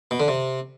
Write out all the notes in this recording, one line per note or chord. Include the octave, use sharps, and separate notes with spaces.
B2
D3
C3